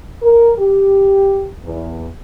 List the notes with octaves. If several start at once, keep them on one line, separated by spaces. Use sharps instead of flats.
A#4
G4
E2